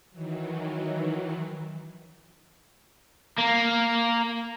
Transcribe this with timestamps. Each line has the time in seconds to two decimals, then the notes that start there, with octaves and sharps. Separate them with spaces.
0.10 D#3 E3 F#3
3.38 A#3